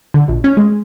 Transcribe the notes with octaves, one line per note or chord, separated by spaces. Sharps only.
D3
A#1
C#4
G#3